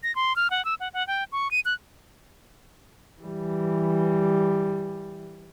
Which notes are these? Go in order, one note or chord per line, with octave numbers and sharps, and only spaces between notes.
A#6
C6
F6
F#5
E6
F#5
F#5
G5
C#6
D#7
F#6
E3 G3